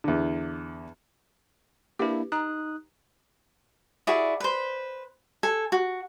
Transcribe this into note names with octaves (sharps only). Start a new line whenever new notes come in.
E2 D3
A#3 D4 E4 G4 B4
D#4 A#5 D#6 F#6
E4 F#4 G#4 D5
B4 C5
A4 G#5
F#4